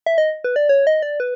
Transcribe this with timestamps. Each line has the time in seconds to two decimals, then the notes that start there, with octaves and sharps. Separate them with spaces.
0.06 E5
0.18 D#5
0.44 B4
0.56 D5
0.69 C#5
0.87 D#5
1.02 D5
1.20 B4